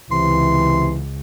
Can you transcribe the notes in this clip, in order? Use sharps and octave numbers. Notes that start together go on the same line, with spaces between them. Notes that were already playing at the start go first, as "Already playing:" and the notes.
C#2 C3 E3 C6